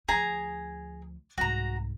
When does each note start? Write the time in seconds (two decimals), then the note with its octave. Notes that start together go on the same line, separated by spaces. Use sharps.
0.08 D2 F3 G#4 A#5
1.38 C2 G#2 F#4 A#5